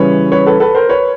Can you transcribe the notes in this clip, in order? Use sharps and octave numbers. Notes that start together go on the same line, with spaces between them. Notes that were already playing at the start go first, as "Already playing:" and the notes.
Already playing: C#3 E3 G3 B4 C#5
B4 C#5
A4 B4
A4 B4
A#4 C5
B4 C#5